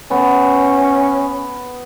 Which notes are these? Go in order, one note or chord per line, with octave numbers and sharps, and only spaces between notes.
B3 C#4